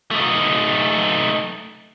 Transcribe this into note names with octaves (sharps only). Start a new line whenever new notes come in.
A3 D#4